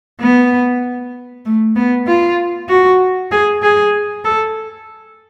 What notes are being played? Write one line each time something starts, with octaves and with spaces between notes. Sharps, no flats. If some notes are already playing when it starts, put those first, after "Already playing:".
B3
A3
B3
F4
F#4
G#4
G#4
A4